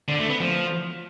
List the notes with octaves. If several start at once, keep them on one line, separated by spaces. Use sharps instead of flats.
D3
A3
B3
F3